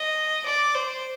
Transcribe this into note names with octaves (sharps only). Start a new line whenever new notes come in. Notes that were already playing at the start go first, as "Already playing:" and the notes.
Already playing: D#5
D5
C5